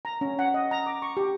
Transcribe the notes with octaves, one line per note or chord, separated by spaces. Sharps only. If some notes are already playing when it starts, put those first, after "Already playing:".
A#5
C#4
F#5
D#5
A#5
D6
C#6
G4